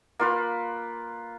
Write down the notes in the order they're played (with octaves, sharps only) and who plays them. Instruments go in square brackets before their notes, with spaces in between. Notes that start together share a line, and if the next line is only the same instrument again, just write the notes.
[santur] A#3 F4 B4